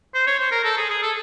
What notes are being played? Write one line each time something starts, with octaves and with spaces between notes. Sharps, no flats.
C5
C#5
C5
A#4
A4
G#4
G#4
A4